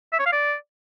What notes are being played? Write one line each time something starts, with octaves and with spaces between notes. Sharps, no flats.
E5
C#5
F5
D5